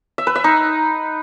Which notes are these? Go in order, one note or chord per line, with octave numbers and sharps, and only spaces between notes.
E5
B4
E5
D#4